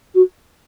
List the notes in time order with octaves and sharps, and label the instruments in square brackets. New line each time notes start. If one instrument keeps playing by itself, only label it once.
[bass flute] F#4